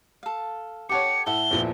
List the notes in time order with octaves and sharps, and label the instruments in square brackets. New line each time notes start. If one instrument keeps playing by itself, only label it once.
[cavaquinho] A4 F5
[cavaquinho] G4 A4 [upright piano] C#5 F#5 D6 [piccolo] C#7
[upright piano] A2 [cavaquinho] A4 E5 F#5 [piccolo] G7
[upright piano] E2 A#2 F3